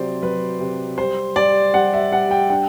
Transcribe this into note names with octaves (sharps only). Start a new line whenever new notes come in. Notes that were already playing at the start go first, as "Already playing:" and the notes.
Already playing: C3 F#3 C5 D5
F#3 B4
C3
G3 C5
G3 D5
G3 F#5
E5
G3 F#5
G5
D4 G5